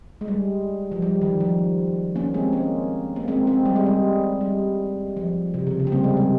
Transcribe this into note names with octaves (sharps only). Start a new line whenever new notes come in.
G#3
G3
F3
G3
D#3
F3
A#3 C#4
G#3 C4
A#3 C#4
A#3
G#3 C4
G#3 C4
G3
G#3
G3
G3
F3
C3
C#3
C#3
C4
G3 A#3
G#3
G3